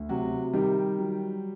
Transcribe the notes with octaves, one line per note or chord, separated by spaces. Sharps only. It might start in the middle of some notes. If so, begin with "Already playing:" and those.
Already playing: D2
C3 F#3 F#4
D#3 G3 G4
F#3